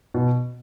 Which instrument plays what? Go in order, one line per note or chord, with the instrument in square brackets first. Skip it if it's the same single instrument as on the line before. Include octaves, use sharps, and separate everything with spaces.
[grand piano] B2